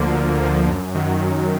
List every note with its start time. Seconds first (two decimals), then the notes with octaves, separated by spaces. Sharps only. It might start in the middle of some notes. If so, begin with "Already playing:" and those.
Already playing: D2 D3 F3 A#3
0.15 D2
0.42 D3 F3 A#3
0.68 F#2
0.95 D#3 F#3
1.21 F#2